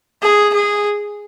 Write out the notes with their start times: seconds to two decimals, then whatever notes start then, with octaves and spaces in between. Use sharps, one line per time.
0.23 G#4
0.54 G#4